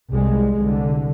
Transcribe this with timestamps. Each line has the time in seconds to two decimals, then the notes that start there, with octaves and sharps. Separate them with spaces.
0.11 C2 G3 G#3
0.60 C2 D3